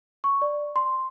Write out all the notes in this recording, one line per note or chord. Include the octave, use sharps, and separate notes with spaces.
C#6
D5
C6